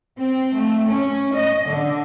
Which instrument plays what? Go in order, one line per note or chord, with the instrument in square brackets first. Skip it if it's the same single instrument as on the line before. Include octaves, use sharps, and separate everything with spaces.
[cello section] C4
A3
C#4
D#5
D3